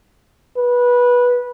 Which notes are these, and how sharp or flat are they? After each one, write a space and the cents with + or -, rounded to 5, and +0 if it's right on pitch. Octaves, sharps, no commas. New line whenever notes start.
B4 -15